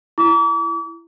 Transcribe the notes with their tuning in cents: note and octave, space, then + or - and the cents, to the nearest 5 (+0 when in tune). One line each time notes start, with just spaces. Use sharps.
E4 +25 D6 -40